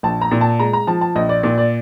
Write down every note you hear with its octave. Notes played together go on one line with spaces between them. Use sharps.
A#1 A5
A#5
A#2
A5
G#3 A#5
A#5
F3 A5
A5
A#1 D#5
D5
A#2 D5
D5